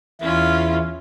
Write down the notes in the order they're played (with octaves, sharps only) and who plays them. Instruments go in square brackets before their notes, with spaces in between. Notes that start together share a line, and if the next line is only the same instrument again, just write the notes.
[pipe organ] E2 E4 [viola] C#4 F4